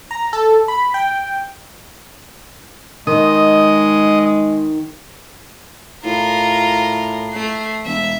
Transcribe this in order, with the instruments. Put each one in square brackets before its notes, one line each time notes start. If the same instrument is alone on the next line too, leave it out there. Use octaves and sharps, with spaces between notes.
[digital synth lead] A#5
A4
B5
G5
[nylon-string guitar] D#3 [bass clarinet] G#3 [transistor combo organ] D#5
[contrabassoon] A2 [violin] F4 A#4
[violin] A3 C7
[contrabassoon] E1 [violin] E5